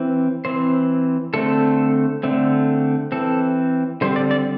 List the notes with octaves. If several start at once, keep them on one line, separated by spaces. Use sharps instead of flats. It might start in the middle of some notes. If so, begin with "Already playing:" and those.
Already playing: E3 C4
E3 C4 C5
D3 A3 C4 A4
D3 A3 C4
E3 C4 A4
D3 G3 C4 C5
D5
D5